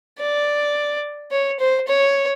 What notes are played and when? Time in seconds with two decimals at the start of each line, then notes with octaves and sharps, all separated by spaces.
0.19 D5
1.31 C#5
1.60 C5
1.88 C#5